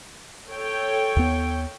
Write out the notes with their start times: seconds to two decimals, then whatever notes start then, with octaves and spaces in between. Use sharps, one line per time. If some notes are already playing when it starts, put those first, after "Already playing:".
0.50 A4 C#5 G5
1.16 D#2 B3